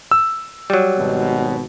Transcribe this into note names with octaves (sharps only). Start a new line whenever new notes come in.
E6
F#3 G3
G#1 G#2 B2